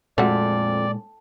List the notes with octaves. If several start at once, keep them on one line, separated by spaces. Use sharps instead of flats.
F2 A#2 G#3 A3 F#4 D5